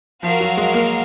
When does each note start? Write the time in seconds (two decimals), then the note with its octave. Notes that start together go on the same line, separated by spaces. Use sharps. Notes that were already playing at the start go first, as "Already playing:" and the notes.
0.23 F3 F#4 A#4 F5
0.40 F#3
0.57 G#3
0.74 A#3